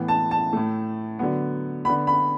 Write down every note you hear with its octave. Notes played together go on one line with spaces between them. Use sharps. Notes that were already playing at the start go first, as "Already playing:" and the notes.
Already playing: A2 E3 B3
A5
A5
A2 A3
D3 F#3 B3
D3 B3 B5
B5